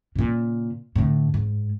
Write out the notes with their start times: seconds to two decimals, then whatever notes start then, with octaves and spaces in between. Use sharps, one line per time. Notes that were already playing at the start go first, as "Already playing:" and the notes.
0.15 A#2 C#3
0.96 A2 D3
1.34 G#2